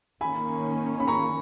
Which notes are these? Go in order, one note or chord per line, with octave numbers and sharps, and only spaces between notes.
D#3 A#3 C#4 G#5 B5
B5
A#5 C#6